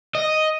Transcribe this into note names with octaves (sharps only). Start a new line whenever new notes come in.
D#5